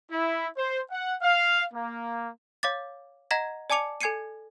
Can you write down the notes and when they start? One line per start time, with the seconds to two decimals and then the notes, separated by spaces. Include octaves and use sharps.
0.11 E4
0.58 C5
0.91 F#5
1.22 F5
1.73 A#3
2.63 C#5 F5 D6 A6
3.31 D#5 F#5 A#5 G#6 A#6 B6
3.70 D5 G#5 A5 D6 C#7 F7
4.01 A4 G#5 G#6 C7 C#7 D#7